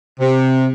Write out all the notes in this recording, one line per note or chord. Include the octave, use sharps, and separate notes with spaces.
C3